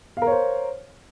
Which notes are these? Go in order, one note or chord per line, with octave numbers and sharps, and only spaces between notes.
A#4 C5 C#5 F5